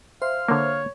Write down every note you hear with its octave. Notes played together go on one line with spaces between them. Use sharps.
C5 E5 F5
D3 A#3 C#5